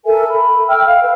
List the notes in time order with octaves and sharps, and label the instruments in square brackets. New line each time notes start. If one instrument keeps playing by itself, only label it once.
[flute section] A4 A#4 E5 G#5
B5
E5 G5 E6 F6
F5
B4